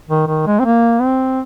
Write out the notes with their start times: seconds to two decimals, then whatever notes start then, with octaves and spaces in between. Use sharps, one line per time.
0.09 D#3
0.27 D#3
0.47 G#3
0.60 C4
0.65 A#3
1.01 C4